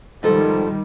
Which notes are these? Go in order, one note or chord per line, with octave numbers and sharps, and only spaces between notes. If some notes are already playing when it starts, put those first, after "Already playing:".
G#2 D#3 F3 G3 A4